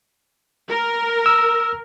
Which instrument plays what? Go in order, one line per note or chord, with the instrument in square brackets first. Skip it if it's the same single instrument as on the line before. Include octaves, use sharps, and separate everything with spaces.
[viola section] A#4
[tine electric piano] E6